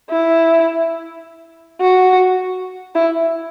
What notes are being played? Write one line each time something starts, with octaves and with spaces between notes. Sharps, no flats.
E4
F#4
E4